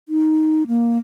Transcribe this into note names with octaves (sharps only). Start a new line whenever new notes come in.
D#4
A#3